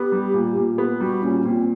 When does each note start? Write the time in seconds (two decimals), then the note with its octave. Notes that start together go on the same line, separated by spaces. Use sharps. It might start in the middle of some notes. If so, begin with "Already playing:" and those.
Already playing: B3 G4
0.12 G3
0.34 A#2
0.57 A#2
0.78 B3
1.00 G3 F#4
1.23 A#2 C#4
1.45 A#2 C4